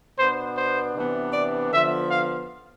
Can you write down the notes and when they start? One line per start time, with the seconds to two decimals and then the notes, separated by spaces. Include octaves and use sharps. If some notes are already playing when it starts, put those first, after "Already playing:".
0.18 B2 B3 D4 C5
0.56 C5
0.95 C3 E3 B3 D4
1.33 D5
1.72 D3 F3 B3 E5
2.10 F5